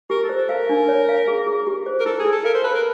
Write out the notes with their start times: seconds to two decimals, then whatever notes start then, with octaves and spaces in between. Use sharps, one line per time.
0.10 G4 A#4
0.24 A4
0.29 C5
0.37 A4
0.49 A#4 F5
0.69 D4
0.88 C#5
1.09 F5
1.28 G#4
1.47 G#4
1.67 G4
1.86 C5
2.00 A#4
2.06 E4 A4
2.19 G#4
2.25 E4
2.32 A4
2.44 A#4 F5
2.55 C5
2.64 B4 A5
2.75 A#4